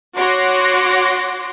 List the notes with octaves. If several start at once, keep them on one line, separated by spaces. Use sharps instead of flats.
F#4 C#5 C6 D6 A#6